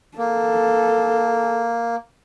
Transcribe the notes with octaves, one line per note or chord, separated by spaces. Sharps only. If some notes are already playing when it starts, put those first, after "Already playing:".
A#3 A4